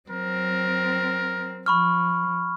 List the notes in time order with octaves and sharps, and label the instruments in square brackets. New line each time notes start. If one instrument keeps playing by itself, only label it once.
[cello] F#3 C4 [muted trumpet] A#4
[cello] F3 [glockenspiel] B5 C#6 F6